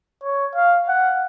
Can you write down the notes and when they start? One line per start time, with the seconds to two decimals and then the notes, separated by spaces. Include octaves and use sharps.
0.23 C#5
0.55 F5
0.89 F#5